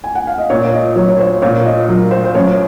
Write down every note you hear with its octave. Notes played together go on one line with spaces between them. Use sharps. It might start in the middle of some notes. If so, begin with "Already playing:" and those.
G#5
F#5
F5
D#5
A#2 C#5
D#5
F#3 C#5
C#5
C5
A#2 C#5
D#5
F#3 A#4
C5
C5
F#2 C#5